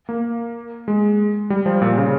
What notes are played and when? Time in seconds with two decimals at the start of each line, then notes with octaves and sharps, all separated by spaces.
0.09 A#3
0.88 G#3
1.50 G3
1.66 F3
1.82 A#2
1.98 C#3